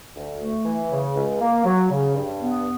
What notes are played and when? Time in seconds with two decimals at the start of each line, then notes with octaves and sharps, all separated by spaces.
0.16 D2
0.40 A3
0.66 E3
0.90 C#3
1.15 C#2
1.40 A#3
1.65 F#3
1.90 C#3
2.14 G2
2.40 B3